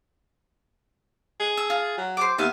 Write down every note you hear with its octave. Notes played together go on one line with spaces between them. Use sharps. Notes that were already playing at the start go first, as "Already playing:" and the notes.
G#4
E6
F4
F#3
C5 G5 D6
D#2 B3 E5 F5